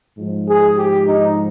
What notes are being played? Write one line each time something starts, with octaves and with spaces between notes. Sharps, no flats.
G#2 F3
G#4
G4
D#4